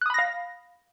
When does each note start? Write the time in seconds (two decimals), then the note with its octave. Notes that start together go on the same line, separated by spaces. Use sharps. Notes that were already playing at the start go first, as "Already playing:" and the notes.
0.01 F#6
0.06 D#6
0.10 B5
0.14 A#6
0.18 F5